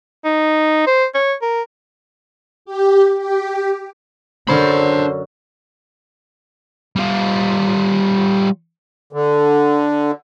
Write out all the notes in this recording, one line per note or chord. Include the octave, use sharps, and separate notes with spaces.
D#4
C5
C#5
A#4
G4
G4
F#2 D3 D4 C5 B5
G3 F4
D3